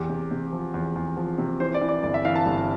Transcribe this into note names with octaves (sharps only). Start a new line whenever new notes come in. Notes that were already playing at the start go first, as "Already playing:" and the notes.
Already playing: E2 G4
C3
C3
F3
E2
E2
F3
C3
E3 C5
D5
E3
D5
G1 D5
E5
E3 F5
A5
G1